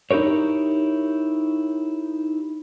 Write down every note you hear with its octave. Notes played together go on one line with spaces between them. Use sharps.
D#4 E4 G4 A#4 C#5